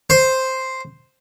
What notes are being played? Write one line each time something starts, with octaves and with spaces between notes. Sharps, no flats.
C5